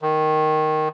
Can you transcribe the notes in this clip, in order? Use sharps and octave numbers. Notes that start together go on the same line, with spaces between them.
D#3